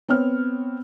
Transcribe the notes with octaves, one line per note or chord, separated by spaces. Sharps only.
B3 C4 C#5 F6